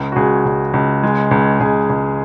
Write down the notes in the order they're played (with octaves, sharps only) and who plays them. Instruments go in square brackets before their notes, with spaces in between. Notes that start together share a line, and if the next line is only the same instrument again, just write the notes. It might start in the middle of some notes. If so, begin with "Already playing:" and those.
Already playing: [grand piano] C#2
F#4
C#2 G#4
C#2
C#2
G#3
C#2
C#2 G#4
C#2